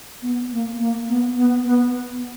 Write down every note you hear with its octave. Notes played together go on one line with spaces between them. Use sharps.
B3
A#3
A#3
B3
B3
B3